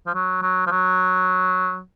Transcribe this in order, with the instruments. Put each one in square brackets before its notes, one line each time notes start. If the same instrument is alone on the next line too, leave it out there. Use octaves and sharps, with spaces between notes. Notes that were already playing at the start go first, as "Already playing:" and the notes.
[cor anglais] F3
F#3
F#3
F3
F#3